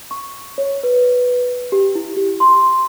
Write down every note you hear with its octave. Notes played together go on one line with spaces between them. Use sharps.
C#6
C#5
B4
G4
E4
G4
C6